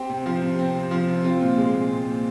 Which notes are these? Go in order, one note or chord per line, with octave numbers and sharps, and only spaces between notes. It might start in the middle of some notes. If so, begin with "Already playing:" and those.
Already playing: C4 G4
C3
F3
C3
C4
C3
F3
C3
C4 F4
A#2
G#3
A#2
C4
A#2